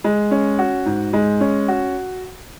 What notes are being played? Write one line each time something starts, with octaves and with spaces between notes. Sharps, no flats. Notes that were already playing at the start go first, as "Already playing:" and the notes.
G#3
C#4
F#4
G#2
G#3
C#4
F#4